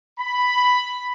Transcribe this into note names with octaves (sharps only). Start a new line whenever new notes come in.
B5